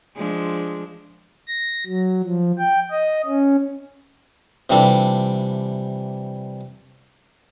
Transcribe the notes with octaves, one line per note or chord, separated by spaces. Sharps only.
F3 G#3 D4
A#6
F#3
F3
G5
D#5
C#4
C3 E3 G3 D4 F4 A4